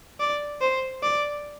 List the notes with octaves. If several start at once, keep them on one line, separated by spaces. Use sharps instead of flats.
D5
C5
D5